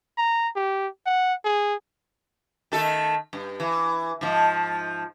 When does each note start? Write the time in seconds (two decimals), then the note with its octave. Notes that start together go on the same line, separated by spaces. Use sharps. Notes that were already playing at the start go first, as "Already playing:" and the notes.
0.17 A#5
0.56 G4
1.06 F#5
1.44 G#4
2.72 D#3 A3 A4
3.33 G2
3.60 E3
4.21 G#2 F3